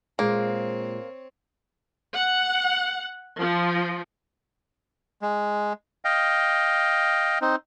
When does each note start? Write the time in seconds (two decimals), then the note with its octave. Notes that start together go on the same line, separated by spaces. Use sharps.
0.19 A#2 G#3 A#3 C4 C#5
2.15 F#5
3.37 F3
5.21 G#3
6.05 D#5 F5 G5
7.41 C4 D#4